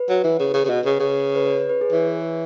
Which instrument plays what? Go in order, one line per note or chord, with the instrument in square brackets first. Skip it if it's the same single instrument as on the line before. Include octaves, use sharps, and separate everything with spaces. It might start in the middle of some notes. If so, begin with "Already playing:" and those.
Already playing: [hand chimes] B4
[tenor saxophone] F#3
E3
C#3
C#3
C#3
B2
C#3
C#3
[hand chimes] B4
C#5
C#5
B4
G#4
[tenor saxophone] E3 [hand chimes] C#5